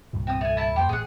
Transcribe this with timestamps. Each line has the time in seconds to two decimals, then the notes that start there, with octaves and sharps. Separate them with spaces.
0.13 C2 G2 A#2
0.27 C4 D#6
0.41 A3 G#5
0.57 E4 A5
0.76 F2 A#3 G4 C5
0.89 A1 A2 G#4 F#5